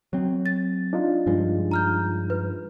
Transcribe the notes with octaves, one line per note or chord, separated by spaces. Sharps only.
F#3 C4
A6
D4 D#4 F4
G2 F3 G#3
A#5 F6 G6
B4